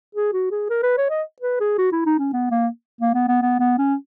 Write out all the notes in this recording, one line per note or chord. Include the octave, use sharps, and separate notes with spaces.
G#4
F#4
G#4
A#4
B4
C#5
D#5
B4
G#4
F#4
E4
D#4
C#4
B3
A#3
A#3
B3
B3
B3
B3
C#4